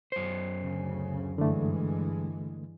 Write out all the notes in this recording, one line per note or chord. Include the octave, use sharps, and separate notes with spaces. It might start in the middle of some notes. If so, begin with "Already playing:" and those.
F#2 C5
D2 C#3
G2 D3 E3 G#3 A3